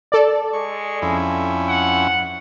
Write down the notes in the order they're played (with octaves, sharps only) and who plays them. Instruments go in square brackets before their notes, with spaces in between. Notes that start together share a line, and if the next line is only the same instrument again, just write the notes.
[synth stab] A4 D5
[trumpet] G#3 [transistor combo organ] C#6
[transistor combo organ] F2 C#4 E4
[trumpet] F#5